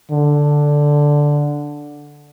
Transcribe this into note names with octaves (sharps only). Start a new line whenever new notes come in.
D3